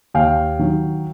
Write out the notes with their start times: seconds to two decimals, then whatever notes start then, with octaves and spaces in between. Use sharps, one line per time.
0.14 D#2 F5 G5
0.59 D#3 F#3